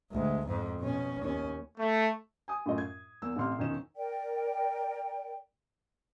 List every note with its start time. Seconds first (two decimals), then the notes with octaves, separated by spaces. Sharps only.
0.12 D2 G#3
0.46 F2 G#2
0.80 B2 C#4
1.21 D#2 C#4
1.78 A3
2.48 G#5 D#6
2.66 F#2 A2 F4 D#5
2.78 G#6
3.22 E2 A#3 E6
3.36 A1 C3 C6 F6
3.58 E1 D#3 F3 C#4 D#4 E7
3.96 A#4 D5 G5